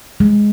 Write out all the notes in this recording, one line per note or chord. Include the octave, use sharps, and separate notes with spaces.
G#3